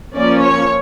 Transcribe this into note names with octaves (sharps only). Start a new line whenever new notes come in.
F3 A#3 C#4 D5
C#5